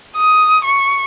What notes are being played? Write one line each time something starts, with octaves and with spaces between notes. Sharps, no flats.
D#6
C#6